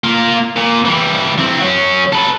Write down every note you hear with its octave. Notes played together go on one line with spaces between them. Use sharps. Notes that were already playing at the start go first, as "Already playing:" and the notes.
A#3 F4
A#2
E3 G3
E3 C4
F#3 C#4
A4 B4